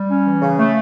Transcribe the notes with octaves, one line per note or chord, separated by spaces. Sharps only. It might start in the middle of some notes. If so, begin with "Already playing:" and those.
Already playing: G3
C#4
E3
C#3
A3